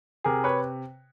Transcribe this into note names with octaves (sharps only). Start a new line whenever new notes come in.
C3 G#4 A#4
B4 C#5